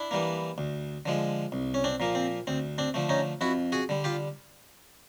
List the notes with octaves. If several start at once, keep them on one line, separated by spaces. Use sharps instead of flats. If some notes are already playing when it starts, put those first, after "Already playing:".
Already playing: D4 E4
E3 G3 A#3
D2
D3 F3 G#3
C2
C#4
C4 D4
A#2 F3 A#3
C4
D2 C4
C4 D4
D3 F3 A3
C#4 D#4
F2 E4 F#4
F#4 G#4
D3 G3
F4 G4